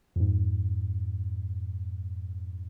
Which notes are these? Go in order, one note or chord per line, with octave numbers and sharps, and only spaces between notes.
F2 G#2